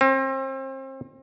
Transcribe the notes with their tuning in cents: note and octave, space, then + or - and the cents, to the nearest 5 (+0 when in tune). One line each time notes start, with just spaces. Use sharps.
C4 +35